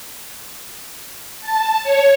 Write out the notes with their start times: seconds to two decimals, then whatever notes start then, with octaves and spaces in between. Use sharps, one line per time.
1.41 A5
1.84 C#5